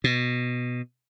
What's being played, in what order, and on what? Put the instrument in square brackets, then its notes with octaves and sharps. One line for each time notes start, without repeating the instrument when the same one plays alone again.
[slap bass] B2